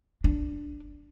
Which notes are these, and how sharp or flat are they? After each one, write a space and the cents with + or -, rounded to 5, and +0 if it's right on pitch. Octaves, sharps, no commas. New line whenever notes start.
D4 +0